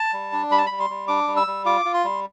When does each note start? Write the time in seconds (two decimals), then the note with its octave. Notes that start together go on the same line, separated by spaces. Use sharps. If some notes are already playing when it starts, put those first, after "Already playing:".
Already playing: A5
0.13 G3
0.32 D4
0.51 G3 B5
0.58 A5
0.66 G3 B5
0.79 C6
0.90 G3
1.08 D4 D6
1.27 G3
1.37 E6
1.47 G3
1.65 F4 D6
1.85 F4
1.94 C6
2.04 G3